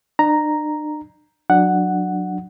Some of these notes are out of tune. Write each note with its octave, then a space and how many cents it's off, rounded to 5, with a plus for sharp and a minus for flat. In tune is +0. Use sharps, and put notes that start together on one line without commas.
D4 +45 A#5 +0
F#3 -10 D4 +15 F#5 +0